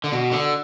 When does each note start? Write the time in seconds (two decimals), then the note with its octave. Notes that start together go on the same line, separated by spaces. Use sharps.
0.04 D3
0.12 B2
0.32 D3